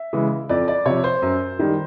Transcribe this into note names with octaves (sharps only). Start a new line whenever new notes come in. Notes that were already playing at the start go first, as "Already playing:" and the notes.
Already playing: E5
C#3 E3 G#3
F2 D5
D5
C3 F3 C#5
C5
F#2
D#3 G3